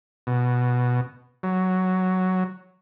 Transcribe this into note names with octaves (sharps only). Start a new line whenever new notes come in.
B2
F#3